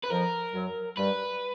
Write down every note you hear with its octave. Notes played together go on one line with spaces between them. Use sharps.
B4
F2 F3 A#4
F#2 F#3
G2 G3 B4